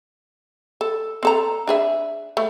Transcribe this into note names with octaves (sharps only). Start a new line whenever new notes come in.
A4
C4 A4 A#5
D4 G#4 E5
A3